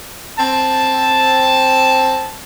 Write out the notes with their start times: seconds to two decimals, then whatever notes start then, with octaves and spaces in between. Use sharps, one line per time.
0.38 C4 A5